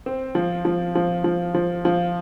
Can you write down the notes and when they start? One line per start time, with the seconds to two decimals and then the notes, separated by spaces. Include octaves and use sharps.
0.06 C4
0.35 F3
0.65 F3
0.95 F3
1.24 F3
1.54 F3
1.85 F3